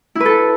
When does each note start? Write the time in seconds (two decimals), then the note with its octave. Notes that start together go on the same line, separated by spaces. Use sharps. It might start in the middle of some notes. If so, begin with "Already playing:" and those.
0.15 E4
0.20 B4
0.25 A4